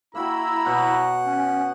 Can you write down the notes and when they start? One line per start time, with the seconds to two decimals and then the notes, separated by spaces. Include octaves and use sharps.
0.15 A#3 E4 F#4 G5 A#5 B5 E6
0.66 B2 C#5 F#5 C#6
1.26 C#4